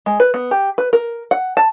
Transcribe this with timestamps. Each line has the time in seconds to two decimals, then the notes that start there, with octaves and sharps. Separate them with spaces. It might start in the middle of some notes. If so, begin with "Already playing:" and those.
0.06 G#3
0.20 B4
0.34 B3
0.51 G4
0.78 B4
0.93 A#4
1.31 F#5
1.57 A5